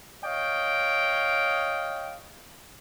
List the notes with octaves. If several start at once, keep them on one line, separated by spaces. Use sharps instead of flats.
C#5 D#5 F5 G5